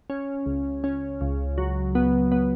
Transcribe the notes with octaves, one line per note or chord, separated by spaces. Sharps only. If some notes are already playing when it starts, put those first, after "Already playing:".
C#4
C#2
C#4
C#2
F#3
B3
B3